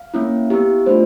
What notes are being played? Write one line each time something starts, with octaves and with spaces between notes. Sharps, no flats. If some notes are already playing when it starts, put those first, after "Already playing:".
Already playing: F5
A#3 C#4 E4
B3 E4 G4
A3 D4 F4 C5